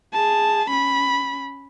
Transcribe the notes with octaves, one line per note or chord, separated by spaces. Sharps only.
G#4 A5
C#4 B5